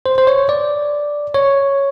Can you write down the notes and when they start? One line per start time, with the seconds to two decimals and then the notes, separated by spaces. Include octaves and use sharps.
0.06 C5
0.18 C5
0.27 C#5
0.49 D5
1.34 C#5